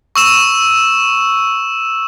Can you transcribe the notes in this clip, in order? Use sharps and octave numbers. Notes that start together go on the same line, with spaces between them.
C#6 E6 E7